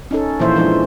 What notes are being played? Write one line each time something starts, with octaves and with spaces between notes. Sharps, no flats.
C#4 D#4 A4
A#2 E3 F3 A#3 C5 E5
E3 F3 G#3 D4 D#4